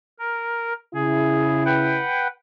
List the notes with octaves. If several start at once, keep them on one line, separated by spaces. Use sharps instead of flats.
A#4
C#3 E4 G#4
B4 F#5 G5